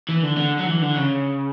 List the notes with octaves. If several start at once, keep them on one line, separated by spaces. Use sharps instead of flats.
E3
D3
D3
F#3
E3
D3
C#3